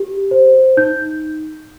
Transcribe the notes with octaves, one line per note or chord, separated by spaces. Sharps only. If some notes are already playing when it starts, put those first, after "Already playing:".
Already playing: G4
C5
D#4 G6